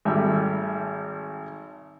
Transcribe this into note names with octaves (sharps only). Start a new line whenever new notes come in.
G#1 G3 A3 E5